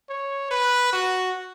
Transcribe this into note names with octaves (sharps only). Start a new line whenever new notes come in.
C#5
B4
F#4